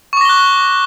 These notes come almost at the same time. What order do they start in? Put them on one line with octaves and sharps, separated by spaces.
C#6 D6 A#6 G7 F#6